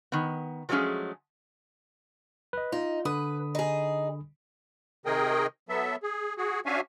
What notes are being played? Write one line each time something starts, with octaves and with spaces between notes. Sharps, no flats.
D#3 B3
F3 F#3 G#3 A3 C#4 G#4
B4 D#5
D#4 F4
D3 B4 B5 D#6
D#4 G#4
C3 D#3 G#4 A#4 D#5 G5
F#3 B3 A4 E5
G#4
F#4 G#4
C#4 D4 F#4 E5 F5 G#5